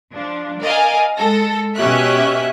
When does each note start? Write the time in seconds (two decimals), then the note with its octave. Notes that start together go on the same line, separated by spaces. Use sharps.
0.12 F3 D4
0.61 A#4 D5 D#5 F5 G#5
1.16 G#3 A4 A#6
1.76 B2 C#4 G4 D#5 E5 F#6